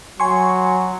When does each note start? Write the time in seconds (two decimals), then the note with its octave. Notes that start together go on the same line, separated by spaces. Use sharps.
0.20 F#3 G#5 C6 C#6